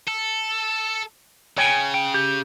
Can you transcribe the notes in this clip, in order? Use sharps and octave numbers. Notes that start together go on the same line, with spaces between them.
A4
C#3 C#5 G5 G#5
G5
G4